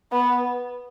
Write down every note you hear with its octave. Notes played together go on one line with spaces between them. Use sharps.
B3